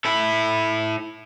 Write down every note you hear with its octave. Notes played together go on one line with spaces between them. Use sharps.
E4 A4